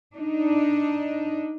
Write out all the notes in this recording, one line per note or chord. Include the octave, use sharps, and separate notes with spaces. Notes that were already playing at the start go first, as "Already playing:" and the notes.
D4 D#4